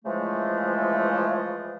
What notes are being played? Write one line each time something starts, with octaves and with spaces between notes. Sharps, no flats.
C#3 E3 F3 G#3 A3